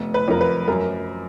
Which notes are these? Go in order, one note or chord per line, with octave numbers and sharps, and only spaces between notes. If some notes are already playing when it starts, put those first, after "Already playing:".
Already playing: F1 B3
B4
F2 A#4
B4
F#2 A#4